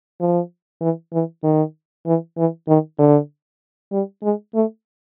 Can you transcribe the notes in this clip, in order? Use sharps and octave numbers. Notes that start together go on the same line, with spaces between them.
F3
E3
E3
D#3
E3
E3
D#3
D3
G3
G#3
A3